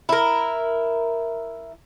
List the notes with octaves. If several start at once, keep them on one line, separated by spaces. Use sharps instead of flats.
E4 A#4